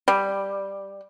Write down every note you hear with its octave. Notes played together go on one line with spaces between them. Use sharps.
G3